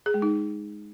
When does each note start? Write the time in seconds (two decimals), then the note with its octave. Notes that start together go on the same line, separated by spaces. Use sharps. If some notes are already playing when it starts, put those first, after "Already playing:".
0.06 G#4
0.14 G#3
0.22 D#4